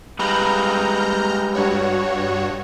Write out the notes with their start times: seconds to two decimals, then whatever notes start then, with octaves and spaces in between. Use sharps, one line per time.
0.19 G3 G#3 B4 A#5 F6 G6
1.55 G2 F#4 C#5